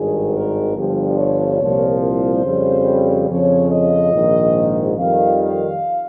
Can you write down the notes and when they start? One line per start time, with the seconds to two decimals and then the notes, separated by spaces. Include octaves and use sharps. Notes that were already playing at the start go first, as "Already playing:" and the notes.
Already playing: G#1 G2 D#3 G#4
0.35 A#4
0.76 G1 G2 F3 G4
1.18 C#5
1.61 C2 A#2 F3
2.03 C5
2.45 F2 C#3 G3
3.29 F2 C#3 F3 C#5
3.71 D#5
4.14 A#1 G#2 D#3
4.97 F2 D#3 G3 F5
5.39 F5